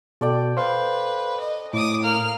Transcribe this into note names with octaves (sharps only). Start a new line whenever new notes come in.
B2 A4 D5 G5
B4 C5 F5 C6
D#5
A2 D6 D#6
A#3 F6